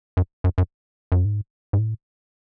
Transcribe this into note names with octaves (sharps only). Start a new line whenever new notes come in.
F#2
F#2
F#2
F#2
G#2
G#2
A2